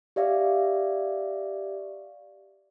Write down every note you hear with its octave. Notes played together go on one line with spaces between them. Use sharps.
G4 D5 E5 F5